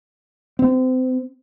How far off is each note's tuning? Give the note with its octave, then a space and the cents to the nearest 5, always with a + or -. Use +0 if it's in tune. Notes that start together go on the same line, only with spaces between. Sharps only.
C4 -30